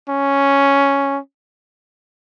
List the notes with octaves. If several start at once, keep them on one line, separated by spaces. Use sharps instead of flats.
C#4